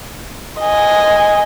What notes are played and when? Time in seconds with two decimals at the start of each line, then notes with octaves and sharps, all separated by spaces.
0.60 D#5 G#5